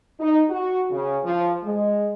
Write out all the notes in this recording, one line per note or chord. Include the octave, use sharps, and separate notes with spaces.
D#4
F#4
C#3
F3
G#3